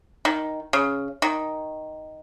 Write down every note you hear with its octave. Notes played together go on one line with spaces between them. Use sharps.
D#3
C#3
D#3